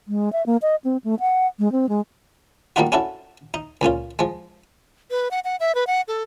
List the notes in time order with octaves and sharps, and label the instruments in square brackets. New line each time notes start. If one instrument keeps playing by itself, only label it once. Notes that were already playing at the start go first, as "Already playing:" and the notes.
[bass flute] G#3
E5
A#3
D#5
C4
A3
F#5
G#3
C4
G#3
[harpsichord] G3 A#3 D4 D#4 F4 F#4
C#4 D4 E4 F#4 A4
D#4
C#2 A#2 C#4 F4
F3 G#3
[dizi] B4
F#5
F#5
E5
B4
F#5
A4